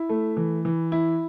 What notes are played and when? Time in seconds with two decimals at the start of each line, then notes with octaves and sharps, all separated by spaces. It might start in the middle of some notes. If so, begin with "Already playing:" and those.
Already playing: E4
0.09 A3
0.37 E3
0.65 E3
0.92 E4